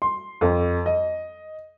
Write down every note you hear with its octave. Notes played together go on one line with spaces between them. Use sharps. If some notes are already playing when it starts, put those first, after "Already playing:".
C6
F2
D#5